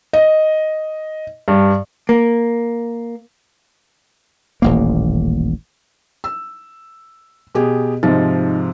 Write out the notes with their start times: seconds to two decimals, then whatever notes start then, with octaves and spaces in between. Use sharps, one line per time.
0.13 D#5
1.48 G2
2.09 A#3
4.62 D#1 A1 A#3
6.24 E6
7.55 B2 G4 G#4
8.03 G#2 C3 F3 D#4